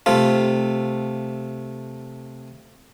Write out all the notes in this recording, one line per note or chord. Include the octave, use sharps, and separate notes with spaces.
C3 A3 F4